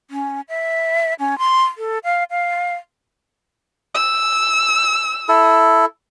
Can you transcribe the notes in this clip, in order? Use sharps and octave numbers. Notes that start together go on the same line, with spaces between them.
C#4
E5
C#4
C6
A4
F5
F5
E6
E4 A4